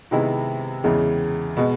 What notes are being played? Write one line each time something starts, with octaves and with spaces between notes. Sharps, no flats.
C3 D#3 G#3 B3 E4
E2 C#3 E3 G#3
B2 G#3 B3